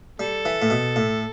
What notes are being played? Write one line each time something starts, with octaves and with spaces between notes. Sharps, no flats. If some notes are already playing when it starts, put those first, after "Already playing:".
G3 A4
E3
A2
B2
A2